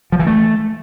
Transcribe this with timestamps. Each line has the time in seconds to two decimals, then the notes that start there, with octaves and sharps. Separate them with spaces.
0.12 F3
0.20 E3
0.27 A3